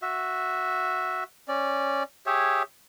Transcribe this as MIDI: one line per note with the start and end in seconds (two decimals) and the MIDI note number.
0.02 1.24 66
0.02 1.24 76
1.48 2.03 61
1.48 2.03 74
2.26 2.63 67
2.26 2.63 68
2.26 2.63 73
2.26 2.63 76